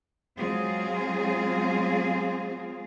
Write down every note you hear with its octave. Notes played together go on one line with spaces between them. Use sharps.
F#3 G#3 C4 F4 G#4